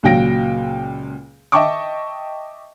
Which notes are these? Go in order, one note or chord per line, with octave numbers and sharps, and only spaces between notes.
C#2 A#2 F#3 G5 A#6 D7
D#5 E5 G5 A5 C#6 D6